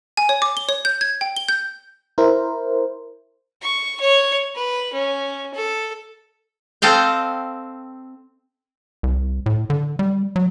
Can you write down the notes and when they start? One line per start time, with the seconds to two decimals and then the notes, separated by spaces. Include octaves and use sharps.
0.17 G#5
0.29 C#5
0.42 D6
0.57 G7
0.69 C#5
0.85 G6
1.01 G#6
1.21 G5
1.36 G7
1.49 G6
2.18 E4 A#4 C5
3.62 C#6
4.01 C#5
4.55 B4
4.93 C#4
5.54 A4
6.82 C4 A4 D#5 F5 G5
9.03 C2
9.46 A2
9.70 D3
9.99 G3
10.36 F#3